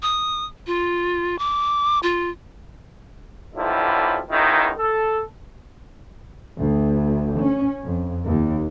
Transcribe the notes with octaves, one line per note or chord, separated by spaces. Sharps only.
D#6
F4
D6
F4
B1 D3 F3 G3 E4
C#2 B2 D#3 D#4 E4
A4
D2
C#4
F2
D#2